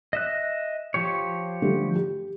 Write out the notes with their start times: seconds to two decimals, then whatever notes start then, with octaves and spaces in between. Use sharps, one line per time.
0.13 D#5 E5 F#6
0.94 F3 G4 C#5
1.62 D3 G3 A3
1.95 G4